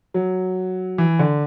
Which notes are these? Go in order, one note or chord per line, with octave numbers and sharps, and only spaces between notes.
F#3
E3
D3